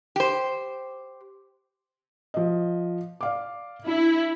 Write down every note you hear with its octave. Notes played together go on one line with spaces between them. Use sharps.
G4 C5
F3 D#5
D5 F5 D6
D4 E4